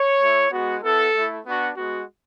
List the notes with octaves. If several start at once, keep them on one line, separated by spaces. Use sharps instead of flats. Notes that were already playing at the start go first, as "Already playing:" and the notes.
Already playing: C#5
A3 E4
G#3 B3 F#4
B3 E4 A4
A3 E4
B3 D4 F#4
G#3 B3 F#4